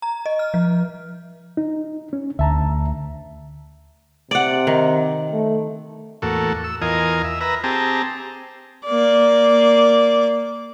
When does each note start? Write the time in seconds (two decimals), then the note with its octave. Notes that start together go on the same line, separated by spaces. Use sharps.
0.02 A#5
0.26 D#5
0.39 F6
0.54 F3
1.57 D#4
2.13 C#4
2.39 D2 E5 A5 A#5
4.31 C3 D5 F#5
4.67 D#3
5.32 A3
6.22 E2 A2 A#3 F#4 A4
6.64 E6
6.82 E2 F4 A#4 D#5 G#5
7.24 E5
7.41 B4 E5 A#5
7.64 C4 G4 G#4 A5 A#5
8.86 A#3 D5